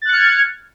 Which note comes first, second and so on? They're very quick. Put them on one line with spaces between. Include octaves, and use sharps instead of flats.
A6 F#6 C#7 F6 G#6